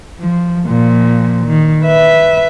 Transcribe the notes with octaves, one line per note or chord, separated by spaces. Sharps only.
F3
A#2 F3
D#3
B4 E5